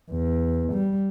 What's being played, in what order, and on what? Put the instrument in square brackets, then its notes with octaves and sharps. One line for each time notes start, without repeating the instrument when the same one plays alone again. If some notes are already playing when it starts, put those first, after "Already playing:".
[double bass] E2
G3